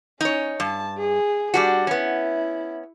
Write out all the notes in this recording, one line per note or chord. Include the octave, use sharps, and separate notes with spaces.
C#4 D#4 C#5
G2 A5
G#4
G3 D4 F#4
B3 C#4 E4